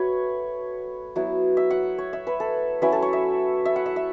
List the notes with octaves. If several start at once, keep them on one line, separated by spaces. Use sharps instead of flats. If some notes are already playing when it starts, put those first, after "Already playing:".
Already playing: A3 F#4 B4 C#5
F#3 B3 E4
E5
F#5
C#5
E5
B4
A4
F#3 C#4 E4 B4
A4
C#5
E5
E5
F#5
E5
E5